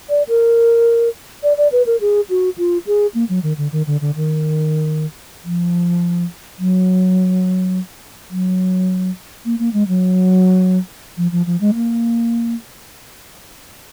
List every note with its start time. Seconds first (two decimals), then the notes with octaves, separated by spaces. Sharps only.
0.10 D5
0.29 A#4
1.43 D5
1.58 D5
1.72 B4
1.86 A#4
2.01 G#4
2.30 F#4
2.58 F4
2.87 G#4
3.15 A#3
3.29 F#3
3.43 D#3
3.58 D3
3.72 D#3
3.87 D3
4.01 D3
4.16 D#3
5.44 F3
6.59 F#3
8.30 F#3
9.45 A#3
9.59 A#3
9.73 G#3
9.88 F#3
11.17 F3
11.32 F3
11.46 F3
11.61 G#3
11.74 A#3